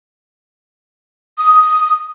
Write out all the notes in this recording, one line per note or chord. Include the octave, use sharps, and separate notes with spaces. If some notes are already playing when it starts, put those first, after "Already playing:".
D#6